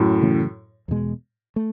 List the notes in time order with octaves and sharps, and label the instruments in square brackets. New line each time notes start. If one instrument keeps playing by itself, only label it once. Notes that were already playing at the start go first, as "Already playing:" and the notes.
Already playing: [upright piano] F#2 A2
[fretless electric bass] C#3 E3 A3 C#4
E2 B2 G#3
A3